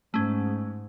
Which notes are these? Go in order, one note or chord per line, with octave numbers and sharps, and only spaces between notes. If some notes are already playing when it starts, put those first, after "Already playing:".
G#2 A3 C#4